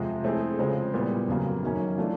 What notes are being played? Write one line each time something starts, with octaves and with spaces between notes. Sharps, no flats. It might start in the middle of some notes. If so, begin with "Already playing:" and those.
Already playing: F2 C3 F3 G#3
A3 C4 E4 G#4
C#3 F3 G#3 C4
A#2 G3 B3 E4
F2 C#3 F#3 A#3
F#2 D#3 F#3 A#3 C#4
E3 A3 D4 F4